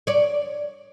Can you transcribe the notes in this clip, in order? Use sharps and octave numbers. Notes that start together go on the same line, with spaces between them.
C#5 D5